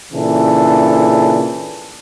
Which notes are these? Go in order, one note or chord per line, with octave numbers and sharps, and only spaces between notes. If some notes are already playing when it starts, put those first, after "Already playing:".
A#2 C#3 E3 D4 A4